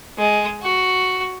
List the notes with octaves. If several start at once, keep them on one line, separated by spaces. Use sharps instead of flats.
G#3
F#4